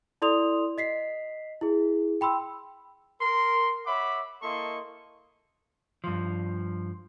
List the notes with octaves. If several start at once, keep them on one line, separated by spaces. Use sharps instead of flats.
E4 A4 D5 C6 D#6 F7
D#5 B6 C7
E4 G#4
G5 B5 C6 E6
A#4 C6
C#5 E5 F#5 B5 D6
A#3 E4 A4 D#5 C6 C#6
G2 F3